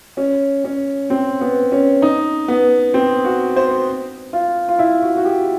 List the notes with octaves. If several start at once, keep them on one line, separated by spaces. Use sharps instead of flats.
C#4
C#4
C4
B3
C#4
D#4
B3
C4
F#4
C5
F4
F4
E4
F#4
F#4
G4